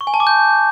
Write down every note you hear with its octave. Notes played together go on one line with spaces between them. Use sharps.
C#6
G#5
A5
D6
G6